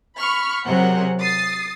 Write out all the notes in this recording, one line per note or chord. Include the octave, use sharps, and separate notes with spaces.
B5 C#6 F6
C3 F#3 G#4 A#4 C5 F#5
D#6 A6 C7